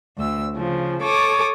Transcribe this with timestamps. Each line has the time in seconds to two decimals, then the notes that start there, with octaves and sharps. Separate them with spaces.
0.18 D2 E6
0.54 C#3 F3
1.03 A4 C#5 D6 D#6